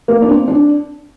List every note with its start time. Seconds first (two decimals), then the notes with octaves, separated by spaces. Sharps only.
0.08 A#3
0.22 D4
0.29 C4
0.48 D4